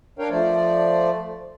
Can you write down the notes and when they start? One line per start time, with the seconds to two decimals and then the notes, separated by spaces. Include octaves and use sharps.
0.19 D4 A#4 C#5 F5 G5
0.30 F3 A3 C5 D5